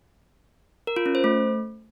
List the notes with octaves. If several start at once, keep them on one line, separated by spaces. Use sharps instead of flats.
A#4
F4
C#4
C5
A3